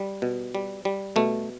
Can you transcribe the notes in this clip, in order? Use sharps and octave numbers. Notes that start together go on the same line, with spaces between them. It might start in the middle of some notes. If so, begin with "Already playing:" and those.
Already playing: G3
B2
G3
G3
B2 A3